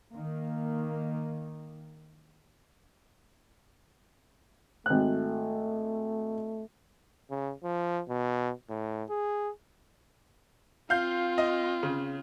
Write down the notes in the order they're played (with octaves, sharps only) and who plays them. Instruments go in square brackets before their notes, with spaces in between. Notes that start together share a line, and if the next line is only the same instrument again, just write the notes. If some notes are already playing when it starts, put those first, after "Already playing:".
[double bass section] D#3 A#3
[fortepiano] G#1 F#6 [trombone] A3
[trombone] C#3
F3
B2
A2
G#4
[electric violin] C4 F4 [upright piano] F5 G6
[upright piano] D#5
C#3